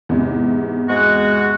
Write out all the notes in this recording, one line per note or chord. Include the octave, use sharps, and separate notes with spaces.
E2 G#2 C3
G#3 F#4